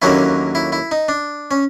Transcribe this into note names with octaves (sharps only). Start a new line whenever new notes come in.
D#2 D3 F#3 A#3 C#4 E4
E4
E4
D#4
D4
C#4